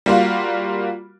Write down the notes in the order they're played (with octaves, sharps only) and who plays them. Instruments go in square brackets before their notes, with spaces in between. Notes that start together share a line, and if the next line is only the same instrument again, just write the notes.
[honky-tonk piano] G3 A#3 F4 F#4